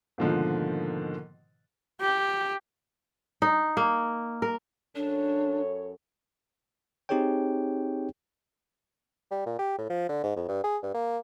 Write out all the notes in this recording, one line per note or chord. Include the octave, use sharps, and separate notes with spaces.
G#2 B2 D3 D#3 F3 A#3
G4
D#4
A#3
A#4
F#2 D4 A4 C#5
C4 D#4 G4 G#4 C#5 G5
G3
A#2
G4
A2
F3
D3
G#2
F2
G2
G#4
G2
A#3